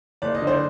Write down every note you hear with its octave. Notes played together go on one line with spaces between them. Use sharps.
F#1 D5
D#5
D3
C5 D5